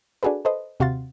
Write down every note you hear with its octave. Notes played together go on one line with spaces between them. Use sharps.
D4 F#4 G#4 A4 B4
A4 B4 C5 D#5
D#2 C3 F#4 F5 C6 A6